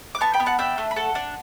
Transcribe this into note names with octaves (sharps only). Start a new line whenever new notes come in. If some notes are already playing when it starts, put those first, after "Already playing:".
D6
B3 A5 C#6
G5 B5
B3
F#5 A5
D4 E5 G5
A3
B5
A4 F#5 A5
D4